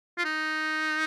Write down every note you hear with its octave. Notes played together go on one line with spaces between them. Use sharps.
F4
D#4